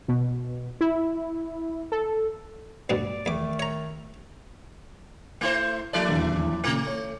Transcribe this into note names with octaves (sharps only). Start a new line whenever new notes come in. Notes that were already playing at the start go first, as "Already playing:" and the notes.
B2
E4
A4
D2 G2 B2 D5
E2 D#3 A3 D6
C#5 A#5
A3 E4 C5
F3 A#3 E4 A4 D5
D#1 E2 D3
A#2 C#3 A3
C#5